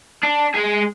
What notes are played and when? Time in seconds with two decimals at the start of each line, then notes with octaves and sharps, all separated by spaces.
0.23 D4
0.55 G#3 G#4